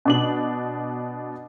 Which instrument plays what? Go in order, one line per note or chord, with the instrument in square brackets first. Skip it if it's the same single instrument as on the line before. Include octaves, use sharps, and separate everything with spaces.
[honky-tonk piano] B2 D4 F#7